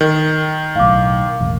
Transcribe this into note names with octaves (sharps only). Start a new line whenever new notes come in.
D#3
B1 A2 F5 D6
E1 A1